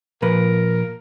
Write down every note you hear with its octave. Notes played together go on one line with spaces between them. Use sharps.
A#2 F3 A#4 B4